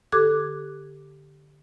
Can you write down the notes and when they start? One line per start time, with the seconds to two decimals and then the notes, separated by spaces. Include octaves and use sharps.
0.12 D3 G4 A4 D6 F#6 G#6